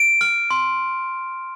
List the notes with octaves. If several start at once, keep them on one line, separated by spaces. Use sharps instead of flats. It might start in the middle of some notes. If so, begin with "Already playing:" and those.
Already playing: D7
F6
C6